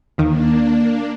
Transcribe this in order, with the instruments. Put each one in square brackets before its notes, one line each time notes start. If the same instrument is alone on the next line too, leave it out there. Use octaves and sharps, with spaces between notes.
[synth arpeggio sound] D#2 D#3 [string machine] A#3 D4